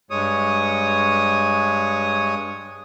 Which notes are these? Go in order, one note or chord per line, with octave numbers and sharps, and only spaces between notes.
G2 G#3 C#5 D#6